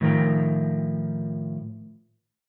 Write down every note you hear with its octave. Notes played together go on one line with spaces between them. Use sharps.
A2 D#3 F3 A#4 G5 A#5